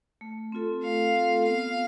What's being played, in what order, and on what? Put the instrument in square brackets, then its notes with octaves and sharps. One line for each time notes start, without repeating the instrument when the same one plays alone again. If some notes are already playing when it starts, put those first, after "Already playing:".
[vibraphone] A3
C4 F4 A4
[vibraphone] A3 [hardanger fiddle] F5
[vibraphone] C4 F4 A4
[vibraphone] B3 [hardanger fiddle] F5